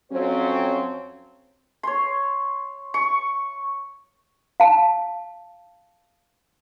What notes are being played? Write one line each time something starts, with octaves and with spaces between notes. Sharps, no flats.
F2 F#3 C4 C#4 F#4 C5
C#5 C6
C#6
F5 A5